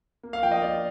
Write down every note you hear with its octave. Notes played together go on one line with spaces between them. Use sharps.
A#3
F5
F3 G5
D#5
A#3 D5